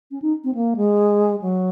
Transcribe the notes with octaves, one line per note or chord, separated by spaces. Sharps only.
C#4
D#4
C4
A#3
G#3
F#3